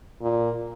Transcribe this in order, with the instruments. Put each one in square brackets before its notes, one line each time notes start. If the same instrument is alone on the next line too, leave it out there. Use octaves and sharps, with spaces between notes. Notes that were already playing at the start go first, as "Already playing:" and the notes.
[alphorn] A#2